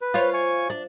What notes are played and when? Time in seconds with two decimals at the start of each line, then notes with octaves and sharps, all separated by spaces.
0.01 B4
0.14 F4 C5 C#5
0.34 G#5 C#6
0.70 D4